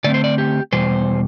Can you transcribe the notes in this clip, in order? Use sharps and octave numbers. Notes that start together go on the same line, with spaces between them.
D3 A3 C4 D5
C5
D5
G4
E2 B2 G3 C5